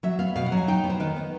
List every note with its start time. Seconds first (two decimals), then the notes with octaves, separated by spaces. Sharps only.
0.03 F#3 E5
0.19 B3 F5
0.36 B2 F5
0.46 F#5
0.52 F#3
0.57 G#5
0.68 D#4 G5
0.84 B3
0.89 C5
1.00 D#3 B4
1.16 B3